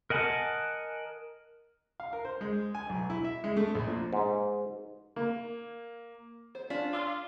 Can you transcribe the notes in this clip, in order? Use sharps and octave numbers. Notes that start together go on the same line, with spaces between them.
A#4 D#5 F#5 G#5 A5
F5
A#4
C5
G#3
G#5
B1
E4
E5
G#3
A3
A#1
A#2
G#2
A#3
C5
C#4 D4 F4 B6
F4 D6 E6 F6